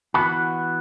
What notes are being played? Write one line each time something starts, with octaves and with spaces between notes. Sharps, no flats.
E3 B3 F#4 B5